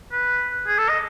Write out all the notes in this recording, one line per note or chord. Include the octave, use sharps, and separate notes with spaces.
B4
G#4
A4
D#5